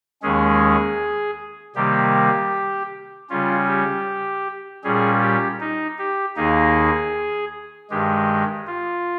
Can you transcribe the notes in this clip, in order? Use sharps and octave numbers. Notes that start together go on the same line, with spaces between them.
D#2 D#3 G#3 C#4 G#4
C3 D#3 G3 A#3 G4
C#3 G3 C#4 F4
G4
A#2 G3 C#4 G#4
G4
D#4
G4
D#2 D#3 A#3 D#4 G#4
G2 D#3 G#3 G4
F4